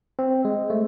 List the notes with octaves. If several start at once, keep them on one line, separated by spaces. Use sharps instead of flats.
C4
G#3
A3